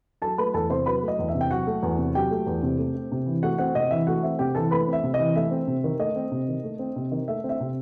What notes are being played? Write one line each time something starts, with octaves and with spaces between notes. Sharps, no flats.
F#3 A4 A5
A3 B4 B5
E2 A4 A5
C3 C5 C6
F#3 B4 B5
A3
D#5
E2
E5
C3
G5
F#3 F#4 F#5
A3
E2
C3
F#3 G4 G5
A3
E2
C3
A3
C4
C3
E3
A3 F#4 F#5
C4 F#4 F#5
C3 D#5
E3 E5
A3 F#4 F#5
C4 E5
C3 G4 G5
E3 A4 A5
A3 B4 B5
C4
E5
C3
D#5
E3
A3 E5
C4
C3
D#3
A3 D#5
C4
C3
D#3
A3
C4
C3
D#3
A3 E5
C4
E5
C3